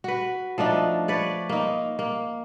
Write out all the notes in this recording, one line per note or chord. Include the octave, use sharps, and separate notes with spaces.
F#4 B4
F3 A3 D4 D#4
B4 C#5 D5
A#3 D#4
A#3